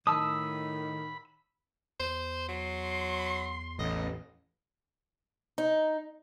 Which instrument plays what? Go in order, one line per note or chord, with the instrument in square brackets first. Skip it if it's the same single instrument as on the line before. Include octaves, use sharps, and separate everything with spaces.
[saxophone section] A2 D#3 [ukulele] A5 [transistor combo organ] B5 [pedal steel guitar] D#6 E6
[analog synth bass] E2 [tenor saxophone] C5
[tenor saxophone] F#3 [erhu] C6
[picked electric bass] A1 [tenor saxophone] D#5
[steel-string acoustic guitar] D#4